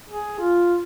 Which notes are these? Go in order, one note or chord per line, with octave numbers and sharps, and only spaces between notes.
G#4
F4